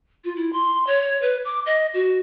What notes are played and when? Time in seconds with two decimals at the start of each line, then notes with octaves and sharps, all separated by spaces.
0.24 F4
0.36 E4
0.52 C6
0.86 C#5
1.21 B4
1.45 D6
1.66 D#5
1.93 F#4